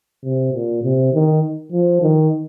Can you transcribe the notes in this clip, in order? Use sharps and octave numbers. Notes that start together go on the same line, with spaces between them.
C3
A#2
C3
D#3
F3
D#3